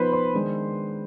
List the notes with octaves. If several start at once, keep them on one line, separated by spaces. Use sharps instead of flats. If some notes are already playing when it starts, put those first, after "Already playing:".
Already playing: F3 B3 D#4 B4 C5 B5 C6
C5 C6
D#3 G#3 D4